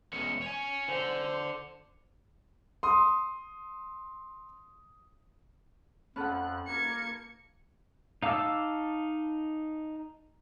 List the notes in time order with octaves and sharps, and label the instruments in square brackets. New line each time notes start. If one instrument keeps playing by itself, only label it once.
[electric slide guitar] E2 G#3 C#4 [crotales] C#7
[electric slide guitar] C#5 G#5
[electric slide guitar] D3 [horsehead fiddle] C5
[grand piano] C6 D#6
[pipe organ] F2 F#6 [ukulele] C#4 A4 F#5 [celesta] A5 B5
[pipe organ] A#3 [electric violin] G#6 C#7
[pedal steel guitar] D#4 F5 A5 D6 E6